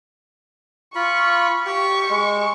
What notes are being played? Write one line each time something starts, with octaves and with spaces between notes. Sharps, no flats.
F4 B5 C#6
G4 G5 C#6
G#3